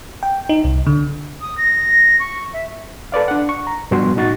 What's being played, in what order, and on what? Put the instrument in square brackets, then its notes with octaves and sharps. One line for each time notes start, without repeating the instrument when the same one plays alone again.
[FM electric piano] G5
D#4
C2
D3
[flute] D#6
A#6
C#6
E5
[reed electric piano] A4 B4 D5 F5
D4 F#5
C#6
A#5
G2 B2 F3 G3 F#4 C6
A2 D#4 F#4 A6